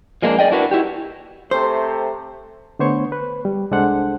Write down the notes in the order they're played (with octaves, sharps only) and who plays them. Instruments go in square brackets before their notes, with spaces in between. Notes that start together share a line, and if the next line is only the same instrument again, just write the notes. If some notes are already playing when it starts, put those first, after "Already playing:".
[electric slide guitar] F3 G#3 A#3 C4 D4 A#4
F#2 G#4 D5 D#5 G5
D4 E4 F#4 A#4 B4
E4 F#4 G4
[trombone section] C3 A3 [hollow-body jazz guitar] C5
[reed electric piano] D3 A3 B3 C5 C#5 C#6
B4
G3
C2 G#3 D4 A4 C5 F#5